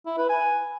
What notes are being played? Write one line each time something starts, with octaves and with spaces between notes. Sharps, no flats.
E4
B4
G#5